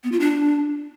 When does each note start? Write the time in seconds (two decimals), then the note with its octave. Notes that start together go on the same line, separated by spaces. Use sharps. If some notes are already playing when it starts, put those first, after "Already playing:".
0.04 B3
0.12 F4
0.20 D4